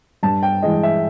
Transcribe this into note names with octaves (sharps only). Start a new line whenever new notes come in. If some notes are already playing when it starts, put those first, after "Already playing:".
G2 A5
G5
E3 G#3 D#5
E5